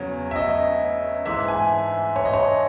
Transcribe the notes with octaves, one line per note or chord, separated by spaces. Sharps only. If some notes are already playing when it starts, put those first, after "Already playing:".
Already playing: E2 C#3 F#3 C#5
E5
D#5
G#2 E3 E5
G#5
C#5
D#5
C#5